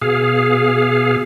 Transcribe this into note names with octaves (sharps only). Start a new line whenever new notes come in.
B2 G#4 F5